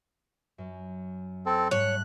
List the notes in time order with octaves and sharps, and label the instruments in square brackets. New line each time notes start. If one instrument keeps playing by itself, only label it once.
[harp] F#2
[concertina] C4 A4
[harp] G#2 G3 A3 [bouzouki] C#5 [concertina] F#6